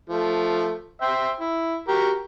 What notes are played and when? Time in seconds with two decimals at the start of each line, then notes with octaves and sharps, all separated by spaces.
0.09 F3 A3
1.01 C5 E5 G5
1.40 E4
1.88 F#4 G4 A#4